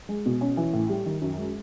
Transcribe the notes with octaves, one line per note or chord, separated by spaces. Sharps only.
G#3
B2
C#4
E3
A2
G3
D#3
F#2
G#3